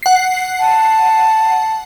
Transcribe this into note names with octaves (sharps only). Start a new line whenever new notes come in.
F#5 C7
A5